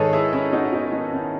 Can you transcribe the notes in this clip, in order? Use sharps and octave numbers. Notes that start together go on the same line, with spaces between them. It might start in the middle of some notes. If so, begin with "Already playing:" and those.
Already playing: G#2 D#3 G#4 A4 B4 C#5 D#5
E4 G#4
C#4 E4
D#4 F#4
B3 D#4
B3 D#4
C#4 E4